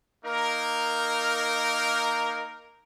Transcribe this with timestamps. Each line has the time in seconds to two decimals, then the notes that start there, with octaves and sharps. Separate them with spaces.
0.25 A#3 D#4 A#4